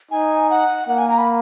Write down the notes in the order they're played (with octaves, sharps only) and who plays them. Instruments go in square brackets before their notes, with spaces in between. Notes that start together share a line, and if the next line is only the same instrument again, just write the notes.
[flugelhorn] D#4 [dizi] G#5
[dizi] F#5
[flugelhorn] A#3 [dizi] F#5
[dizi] G#5
A#5
B5